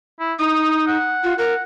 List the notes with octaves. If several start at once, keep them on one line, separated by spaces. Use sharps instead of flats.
E4
D#4 D#6
F#5
F4
A#4 F#5